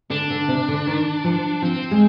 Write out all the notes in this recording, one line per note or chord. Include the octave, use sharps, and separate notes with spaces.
D3 D4
D3
C3
D3
D#3
F3
F3 C4
G#3